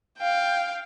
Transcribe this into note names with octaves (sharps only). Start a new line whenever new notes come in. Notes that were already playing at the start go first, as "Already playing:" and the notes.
F5 G5